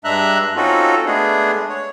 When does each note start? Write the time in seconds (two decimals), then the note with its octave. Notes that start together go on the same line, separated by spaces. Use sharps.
0.05 G2 G#3 D4 E5 A#5 F#6
0.57 C4 C#4 D#4 F4 F#4 A4
1.06 G#3 A3 B3 D4 G#4
1.69 C#5